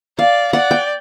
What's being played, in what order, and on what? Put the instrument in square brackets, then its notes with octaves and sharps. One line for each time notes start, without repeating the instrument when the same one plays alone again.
[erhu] D5 [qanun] F5
[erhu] D5 [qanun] F#5
[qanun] G5